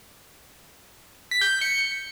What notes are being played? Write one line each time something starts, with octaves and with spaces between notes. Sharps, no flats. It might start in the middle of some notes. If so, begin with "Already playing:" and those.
B6
G6
G6
C#7